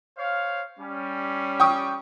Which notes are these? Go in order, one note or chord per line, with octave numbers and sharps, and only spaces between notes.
C5 C#5 F5
G3 C#4
G5 C#6 D#6